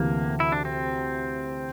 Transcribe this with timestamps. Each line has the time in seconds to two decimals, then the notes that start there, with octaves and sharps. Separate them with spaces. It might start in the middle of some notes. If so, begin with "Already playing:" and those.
Already playing: D2 C3 E3 A#3
0.40 E4
0.52 D4
0.65 C4